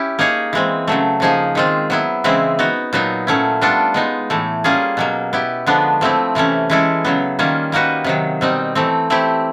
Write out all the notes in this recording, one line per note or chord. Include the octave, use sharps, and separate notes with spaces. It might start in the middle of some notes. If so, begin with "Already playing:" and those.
Already playing: C#4 E4 G4
A#3 D#4 G#4 C#5
E3 G#3 C4
C#3 F#3 A3
C#3 F3 A#3 D#4 G#4
D#3 G#3 C4 F4
F#3 B3 E4
C#3 E3 G#3 C4 E4
B3 D#4 F#4
A#2 F#3 B3 D#4
A#2 F#3 A3 C#4 E4
G3 B3 D4 F4 A4
G#3 B3 D#4
A2 E3 A3
G3 A#3 C#4 F4 G#4
B2 F#3 A#3
B3 E4 G4
D3 F3 G#3 B3 D4
F3 A3 C4 E4
C3 E3 A3 C#4
E3 G#3 C#4 E4 A4
C#3 F#3 B3
D#3 G3 A#3 C#4 F4
G3 A#3 D#4 F#4 B4
C3 D#3 F#3
B2 G3 C4 D#4
E3 A3 C4
A3 C4 E4 G4